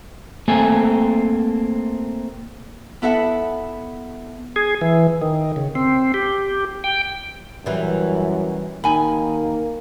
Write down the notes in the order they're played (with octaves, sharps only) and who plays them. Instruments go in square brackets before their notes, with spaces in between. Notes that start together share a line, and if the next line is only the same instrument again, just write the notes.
[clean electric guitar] A3 A#3 C4 A4 G#5
[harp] B3 E4 A4 E5 F#5
[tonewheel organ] G#4
E3
D#3
C#3
C4
G4
G5
[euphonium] F#2 [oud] E3 G3
[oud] D#2 [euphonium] A#3 [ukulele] D#4 G#5 B5